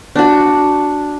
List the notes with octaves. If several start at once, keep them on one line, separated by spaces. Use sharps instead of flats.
D4 F#4